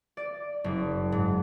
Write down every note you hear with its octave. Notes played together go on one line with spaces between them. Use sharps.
D5
F#1
G#2